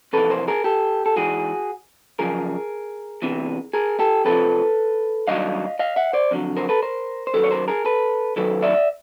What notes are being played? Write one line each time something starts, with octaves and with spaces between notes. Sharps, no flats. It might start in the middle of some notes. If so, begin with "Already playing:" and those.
F2 C3 E3 A4 B4
A#4 C5
G#4 A#4
G4 A4
A4
G#2 E3 F#4 G#4
F#2 C#3 F3 G#4 A#4
E2 C3 E3
G#4 A#4
G4 A4
F2 C3 F3 A4 B4
G2 D#3 F#3 D#5 F5
D#5 F5
E5 F#5
C5 D5
F2 D3 F#3
A#4 C5
A4 B4
A#4 C5
C5
F#2 D#3 F#3 A4 B4
C#5
A#4 C5
G#4 A#4
A4 B4
F#2 D#3 F#3 A4 B4
D5 E5